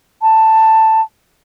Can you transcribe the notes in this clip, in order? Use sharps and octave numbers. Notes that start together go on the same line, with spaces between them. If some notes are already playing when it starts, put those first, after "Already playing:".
A5